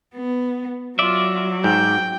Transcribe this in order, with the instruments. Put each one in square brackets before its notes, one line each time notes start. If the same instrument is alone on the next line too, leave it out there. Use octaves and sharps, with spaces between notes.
[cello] B3
[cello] F#3 [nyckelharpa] F4 [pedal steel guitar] D5 E5
[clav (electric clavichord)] G#2 [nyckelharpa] G5